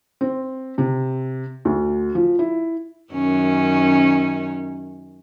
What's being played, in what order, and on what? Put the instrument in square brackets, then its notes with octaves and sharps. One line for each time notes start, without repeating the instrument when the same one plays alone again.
[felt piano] C4
C3
D2
F3
E4
[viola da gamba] F#2 D#3 C#4